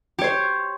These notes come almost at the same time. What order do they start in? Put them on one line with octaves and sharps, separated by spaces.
G4 C#5 C5